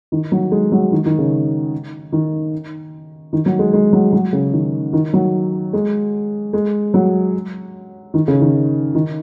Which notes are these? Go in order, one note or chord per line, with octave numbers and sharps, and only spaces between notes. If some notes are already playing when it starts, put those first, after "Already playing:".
D#3
F#3
G#3
F#3
D#3
D#3
C#3
D#3
D#3
F#3
G#3
G#3
F#3
F#3
C#3
D#3
D#3
F#3
G#3
G#3
F#3
D#3
C#3
D#3
D#3